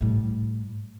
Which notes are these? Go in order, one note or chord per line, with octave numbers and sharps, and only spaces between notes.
A2 G3